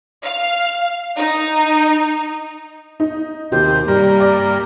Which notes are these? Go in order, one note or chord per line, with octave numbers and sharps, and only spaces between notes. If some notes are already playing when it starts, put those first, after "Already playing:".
F5
D#4
D#4
D#2 C3 G4 G6
G2 G3 A#3 F6
D5